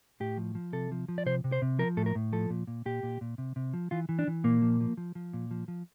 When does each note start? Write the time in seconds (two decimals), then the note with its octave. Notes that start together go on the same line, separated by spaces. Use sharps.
0.20 A2 G4
0.37 F3
0.55 F3
0.73 C3 A4
0.92 F3
1.08 F3
1.18 D5
1.26 C3 C5
1.44 C3
1.52 C5
1.62 C3
1.79 F3 A#4
1.97 A2 A4
2.06 A#4
2.15 A2
2.32 F3 A4
2.50 A#2
2.67 A#2
2.86 A#2 G4
3.03 A#2
3.21 A#2
3.38 C3
3.56 C3
3.74 F3
3.91 E3 F4
4.09 E3
4.19 D4
4.28 E3
4.44 A#2 A#3
4.62 F3
4.81 F3
4.97 F3
5.15 F3
5.33 A#2
5.51 F3
5.68 F3